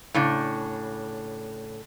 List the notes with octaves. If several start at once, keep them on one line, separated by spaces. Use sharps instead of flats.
A2 C#3 D4